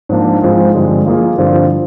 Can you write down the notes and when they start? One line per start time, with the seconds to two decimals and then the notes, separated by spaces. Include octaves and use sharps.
0.09 G#2 F3 A#3 D4
0.42 G#2 F3 G#3 C4 F4
0.74 G2 D3 F3 G#3 C4
1.06 F3 A#3 F4 G#4
1.38 G2 D3 F3 C4 F4